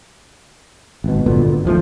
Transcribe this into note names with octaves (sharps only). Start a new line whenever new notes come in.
G#1 B2
G1 A#2 D3 B3
D#2 F3 A3